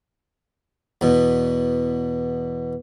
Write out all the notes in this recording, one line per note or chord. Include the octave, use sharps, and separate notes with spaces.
E2 B2